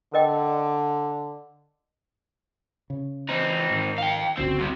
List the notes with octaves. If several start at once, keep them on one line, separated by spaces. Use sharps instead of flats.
D3 A#4 D#5 G5
C#3
E3 C4 D#4
G#2 D#3
F5 G5
F#1 C#2 D3 C4 F#4
C2 C3